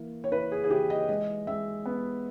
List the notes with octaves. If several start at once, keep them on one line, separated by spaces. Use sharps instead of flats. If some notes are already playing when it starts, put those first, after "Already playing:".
Already playing: E3 A#3
C#5
E3 B4
G#4
G#4
E3 G4
D#5
G#3 D#5
G#3 E5
B3